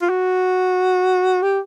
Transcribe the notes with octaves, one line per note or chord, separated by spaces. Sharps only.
F4
F#4
G4